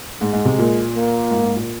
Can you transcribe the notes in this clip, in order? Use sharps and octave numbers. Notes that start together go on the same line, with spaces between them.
G#2 G#3
G#2
C3
A#2
A#3
G#2
G#2
A#2